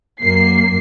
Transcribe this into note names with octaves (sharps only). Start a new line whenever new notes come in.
F#2 A#3 C7